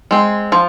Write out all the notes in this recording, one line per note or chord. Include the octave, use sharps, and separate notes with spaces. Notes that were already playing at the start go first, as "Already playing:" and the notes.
G#3 C4
F3